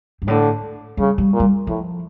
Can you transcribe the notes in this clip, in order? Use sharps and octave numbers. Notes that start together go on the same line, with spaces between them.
G2
A2 D3
C#3 G3
G3
A#2
G3
A2 F3